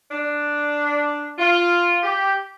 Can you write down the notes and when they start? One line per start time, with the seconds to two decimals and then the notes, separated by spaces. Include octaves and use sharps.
0.11 D4
1.39 F4
2.03 G4